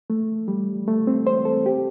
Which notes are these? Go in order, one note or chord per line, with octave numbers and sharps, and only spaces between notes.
A3
G3
A3
C4
C5
A4
G4